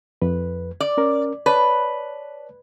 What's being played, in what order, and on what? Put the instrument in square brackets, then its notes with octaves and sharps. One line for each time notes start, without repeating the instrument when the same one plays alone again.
[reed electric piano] F2 B4
[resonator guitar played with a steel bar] D5
[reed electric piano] C#4 A#4
[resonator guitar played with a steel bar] B4 [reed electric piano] C#5 D5 A5